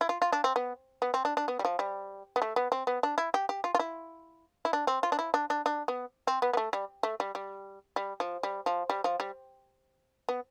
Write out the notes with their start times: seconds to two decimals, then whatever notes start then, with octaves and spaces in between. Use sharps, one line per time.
0.01 E4
0.09 F4
0.22 F4
0.32 D4
0.44 C4
0.56 B3
1.02 B3
1.14 C4
1.25 D4
1.37 D4
1.48 B3
1.59 G3
1.65 F3
1.79 G3
2.36 B3
2.42 A3
2.56 B3
2.72 C4
2.87 B3
3.03 D4
3.18 E4
3.34 G4
3.49 G4
3.64 F4
3.75 F4
3.79 E4
4.65 E4
4.73 D4
4.87 C4
5.03 F4
5.12 D4
5.19 E4
5.34 D4
5.50 D4
5.66 D4
5.88 B3
6.27 C4
6.42 B3
6.53 B3
6.57 A3
6.73 G3
7.03 A3
7.20 G3
7.35 G3
7.96 G3
8.20 F3
8.43 G3
8.66 F3
8.90 G3
9.04 F3
9.20 G3
10.29 B3